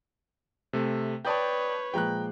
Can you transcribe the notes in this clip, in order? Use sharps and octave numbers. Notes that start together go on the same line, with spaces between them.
C3 A3
B4 C#5 D5 G5 A5 D#6 G6
A#2 F3 G#3 G5 A#5 F#6